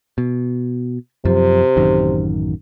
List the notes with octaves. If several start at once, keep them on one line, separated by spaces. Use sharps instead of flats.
B2
F#2 C3 F3
A1 F#2 D#3